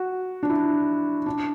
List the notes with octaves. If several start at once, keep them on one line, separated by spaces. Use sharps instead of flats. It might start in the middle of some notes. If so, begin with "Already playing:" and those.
Already playing: F#4
D4
E4
D4